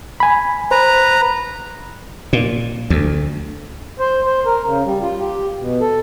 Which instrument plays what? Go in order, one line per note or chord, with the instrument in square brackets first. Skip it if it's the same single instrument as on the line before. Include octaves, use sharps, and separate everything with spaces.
[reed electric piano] G#5 B5
[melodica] B4 A#5 [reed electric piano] C5
[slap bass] A#2
D2
[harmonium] C5
C5
A#4
C#3
G3
F4
G4
B2
A4